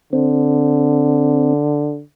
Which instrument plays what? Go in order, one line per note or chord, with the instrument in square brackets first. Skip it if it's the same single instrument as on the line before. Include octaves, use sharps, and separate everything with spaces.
[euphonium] D3 [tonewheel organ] C4